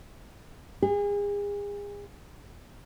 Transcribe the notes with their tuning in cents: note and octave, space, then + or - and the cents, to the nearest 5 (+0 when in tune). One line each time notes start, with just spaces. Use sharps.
G#4 -35